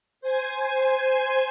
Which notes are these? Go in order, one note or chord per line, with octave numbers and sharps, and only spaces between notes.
C5 G#5